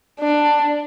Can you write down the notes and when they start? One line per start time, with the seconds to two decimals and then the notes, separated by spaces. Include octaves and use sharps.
0.20 D4